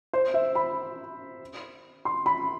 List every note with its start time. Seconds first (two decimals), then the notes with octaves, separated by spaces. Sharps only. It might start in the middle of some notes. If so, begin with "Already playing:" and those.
0.13 C5
0.34 E5
0.55 B5
2.05 C6
2.26 B5